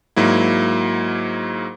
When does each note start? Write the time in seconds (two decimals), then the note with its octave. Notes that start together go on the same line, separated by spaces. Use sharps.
0.16 G#2 F#3 A#3 E4